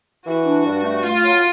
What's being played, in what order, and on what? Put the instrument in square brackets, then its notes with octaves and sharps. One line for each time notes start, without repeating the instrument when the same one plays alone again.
[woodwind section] E3 [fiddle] F#4
[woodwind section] D4
G2
A3
[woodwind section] A3 [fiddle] F4
[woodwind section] F#3